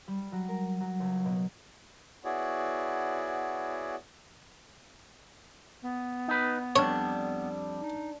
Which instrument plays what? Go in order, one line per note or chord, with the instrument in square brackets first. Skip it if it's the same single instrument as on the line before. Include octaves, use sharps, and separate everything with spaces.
[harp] G3
F#3
A#4
F#3
C#2
B2
[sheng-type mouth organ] B3 E4 F#4 G#4 C#5 D5
[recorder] B3
[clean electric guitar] D#4 B4
[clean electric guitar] F2 G3 [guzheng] D4 [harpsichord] C#5
[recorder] D#4